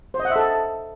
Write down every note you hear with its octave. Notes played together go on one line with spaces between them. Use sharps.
C5
D#5
F#5
E5
A4